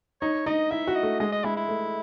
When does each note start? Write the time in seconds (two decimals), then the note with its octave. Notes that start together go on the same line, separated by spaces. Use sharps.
0.22 D#4 C#5
0.46 D#4 D#5
0.71 E4 E5
0.87 F#4
0.96 D#5
1.03 A3
1.20 G#3 D#5
1.32 D#5
1.44 G#3 E4
1.57 E4
1.69 A3